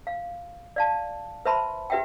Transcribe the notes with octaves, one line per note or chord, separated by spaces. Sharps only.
F5
D5 F5 A5
B4 C5 E5 A5 B5 C6
G4 B4 E5 F#5 G5